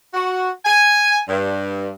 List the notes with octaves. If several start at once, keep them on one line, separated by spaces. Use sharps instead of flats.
F#4
G#5
G2